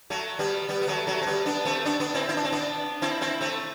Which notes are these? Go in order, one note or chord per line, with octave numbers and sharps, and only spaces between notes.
F#3 A3
G3 B3
G3 B3
B3
F#3 A3
F#3 A3
C4
G3 B3
B3 D4
A3 C4
B3 D4
B3 D4
C4 E4
E4
D4
C4
B3 D4
C4 E4
C4 E4
A3 C4